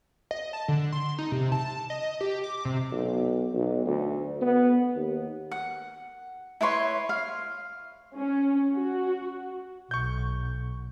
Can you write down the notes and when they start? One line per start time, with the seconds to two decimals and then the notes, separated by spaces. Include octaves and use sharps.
0.31 D#5
0.53 A5
0.68 D3
0.92 C6
1.18 D#4
1.32 C3
1.52 A5
1.90 D#5
2.21 G4
2.44 D6
2.65 C3
2.92 B1
3.54 B1
3.86 D2
4.41 B3
4.95 D#2
5.51 F#5
6.61 E4 B4 C#5 C6
7.09 F5
8.16 C#4
8.74 F#4
9.91 B1 C#6 G6